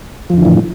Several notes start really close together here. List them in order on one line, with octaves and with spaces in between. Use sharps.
F3 F2 D3 E3 A2